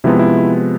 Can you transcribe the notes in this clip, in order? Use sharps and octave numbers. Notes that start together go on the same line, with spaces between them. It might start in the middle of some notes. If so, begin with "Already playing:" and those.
C3 F3 G#3 B3 E4
E4